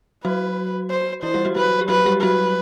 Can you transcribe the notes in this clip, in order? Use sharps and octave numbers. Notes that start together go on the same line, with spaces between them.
F#3 F#4 B4
C5
E3 E4 C5
G3 G4
F#3 F#4
F#3 F#4 B4
G4
F#3 F#4 B4
G3 G4
F#3 F#4 B4